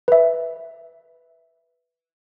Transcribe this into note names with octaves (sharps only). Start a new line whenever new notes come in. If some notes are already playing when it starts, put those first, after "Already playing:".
B4 E5